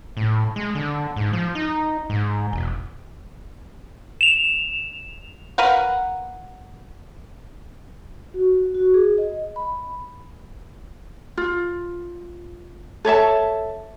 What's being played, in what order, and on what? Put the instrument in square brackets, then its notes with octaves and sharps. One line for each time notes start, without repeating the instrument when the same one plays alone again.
[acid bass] A2
G#3
D3
G#2
F3
D#4
G#2
E1
[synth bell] E7 F7
[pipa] A#4 B4 F5 F#5
[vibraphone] F#4
F#4
G#4
D#5
B5
[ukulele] F4
A4 C#5 E5 A5